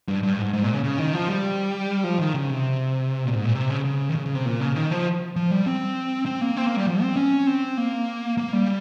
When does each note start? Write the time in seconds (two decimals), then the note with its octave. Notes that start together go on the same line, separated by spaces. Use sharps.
0.08 G2
0.23 G2
0.38 G#2
0.54 G#2
0.63 A#2
0.73 C#3
0.83 C#3
0.99 D#3
1.13 F3
1.29 G3
2.04 F3
2.19 D#3
2.34 C#3
2.50 C3
3.25 A#2
3.35 G#2
3.45 A#2
3.55 C3
3.70 C#3
3.85 C#3
4.09 D#3
4.15 C#3
4.26 C#3
4.35 C3
4.46 A#2
4.60 C#3
4.76 D#3
4.91 F3
5.36 F3
5.51 G3
5.66 C4
6.26 C4
6.41 A#3
6.56 C4
6.66 A#3
6.77 G3
6.87 F3
7.02 C4
7.17 C#4
7.47 C4
7.78 A#3
8.37 A#3
8.53 G3